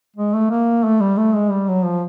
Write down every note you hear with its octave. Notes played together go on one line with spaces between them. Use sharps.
G#3
A3
A#3
A3
G3
A3
G#3
G3
F#3
F3